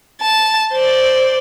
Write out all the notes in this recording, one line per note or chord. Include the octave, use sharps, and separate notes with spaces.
A5
C5 D5